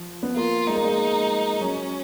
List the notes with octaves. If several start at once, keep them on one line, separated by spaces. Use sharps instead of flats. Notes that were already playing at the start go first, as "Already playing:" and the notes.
Already playing: F3
B3
A#3 F4
G#3 D#4
A#3
G#3
F#3 C#4